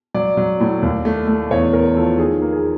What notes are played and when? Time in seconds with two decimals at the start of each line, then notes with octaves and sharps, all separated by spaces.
0.14 F#3 D5
0.37 F#3
0.60 A2
0.82 D#2
1.05 A3
1.27 A3
1.51 E2 C#5
1.73 E2 A#4
1.96 F3 A4
2.19 D#3 G#4
2.42 A#3
2.53 G#4